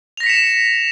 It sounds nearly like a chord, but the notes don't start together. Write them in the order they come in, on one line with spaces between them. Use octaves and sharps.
F7 A#6 B6 C#7 E7